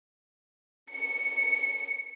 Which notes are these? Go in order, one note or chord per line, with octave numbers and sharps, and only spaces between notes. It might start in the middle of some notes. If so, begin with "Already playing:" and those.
C#7